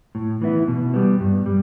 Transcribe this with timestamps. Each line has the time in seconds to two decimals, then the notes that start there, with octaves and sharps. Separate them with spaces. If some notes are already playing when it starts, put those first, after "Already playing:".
0.15 A2
0.42 E3 B3 E4
0.68 B2
0.94 G3 B3
1.20 G2
1.46 G3